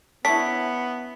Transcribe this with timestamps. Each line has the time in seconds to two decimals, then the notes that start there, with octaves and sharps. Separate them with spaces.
0.25 B3 C#4 D4 E4 B6